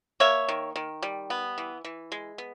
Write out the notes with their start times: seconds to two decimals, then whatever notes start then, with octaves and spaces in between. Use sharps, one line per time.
0.20 A#3 C#5 E5
0.48 D#3
0.76 D#3
1.02 G3
1.30 B3
1.58 E3
1.85 E3
2.12 G#3
2.38 B3